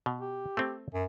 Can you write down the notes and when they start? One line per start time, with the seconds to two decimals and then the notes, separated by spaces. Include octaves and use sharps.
0.06 B2
0.21 G4
0.57 A3 C4
0.94 F#2